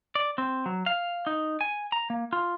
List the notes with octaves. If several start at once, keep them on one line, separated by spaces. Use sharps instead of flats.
D5
C4
F#3
F5
D#4
G#5
A#5
A#3
F4